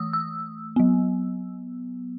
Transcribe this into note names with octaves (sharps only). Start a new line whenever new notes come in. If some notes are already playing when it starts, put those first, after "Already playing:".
Already playing: E3 A3 D#6 E6
E6
F#3 B3